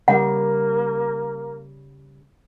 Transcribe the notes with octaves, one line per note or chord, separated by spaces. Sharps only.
C#3 G3 A#3 F#5